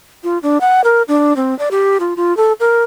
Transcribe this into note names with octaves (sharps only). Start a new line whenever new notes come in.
F4
D4
F#5
A#4
D4
C4
D5
G4
F4
F4
A4
A#4